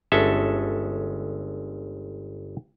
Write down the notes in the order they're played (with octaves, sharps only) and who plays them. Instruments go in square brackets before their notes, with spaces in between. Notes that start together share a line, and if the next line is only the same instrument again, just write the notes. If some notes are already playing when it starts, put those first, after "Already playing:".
[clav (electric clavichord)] G1 G#3 C#4 A4 E5 A5